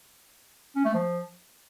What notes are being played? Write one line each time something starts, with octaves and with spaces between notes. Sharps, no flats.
C#4
A3
F3